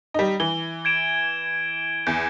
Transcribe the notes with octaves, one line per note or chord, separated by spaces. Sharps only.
G3 D#4
E3 G7
G#6 D7 E7
E2 G6